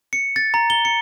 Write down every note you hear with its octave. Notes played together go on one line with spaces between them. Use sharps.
C#7
A6
A#5
G7
C#7